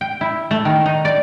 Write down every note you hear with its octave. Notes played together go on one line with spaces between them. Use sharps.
G5
E4
A3
D#3
D#4
D5